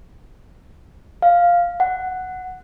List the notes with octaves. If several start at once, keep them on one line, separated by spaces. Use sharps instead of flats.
F5
F#5